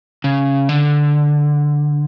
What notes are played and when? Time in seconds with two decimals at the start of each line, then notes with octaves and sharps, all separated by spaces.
0.24 C#3
0.69 D3